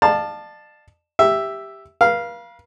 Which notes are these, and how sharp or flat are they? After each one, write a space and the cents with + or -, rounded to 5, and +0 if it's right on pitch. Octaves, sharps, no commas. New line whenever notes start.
D5 +45 F5 +0 A5 +0
G4 +5 E5 +0
B4 -45 F5 -10